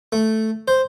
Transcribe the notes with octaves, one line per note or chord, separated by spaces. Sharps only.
A3
C5